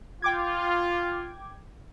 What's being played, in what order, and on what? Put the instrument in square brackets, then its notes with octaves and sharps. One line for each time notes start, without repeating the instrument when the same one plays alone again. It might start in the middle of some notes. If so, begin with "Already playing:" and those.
[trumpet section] F4 [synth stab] G5 D6 G#6